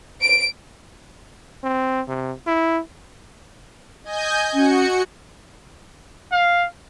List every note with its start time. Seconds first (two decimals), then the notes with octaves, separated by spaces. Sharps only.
0.21 D7
1.64 C4
2.08 C3
2.47 E4
4.04 D#5 G#5 G6
4.54 C#4 F#4 C#7
6.32 F5